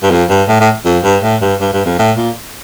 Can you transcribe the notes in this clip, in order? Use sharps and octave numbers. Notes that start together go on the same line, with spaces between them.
G2
F2
G2
A2
A2
F2
G2
A2
G2
G2
G2
F2
A2
A#2